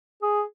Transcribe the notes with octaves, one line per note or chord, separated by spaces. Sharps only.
G#4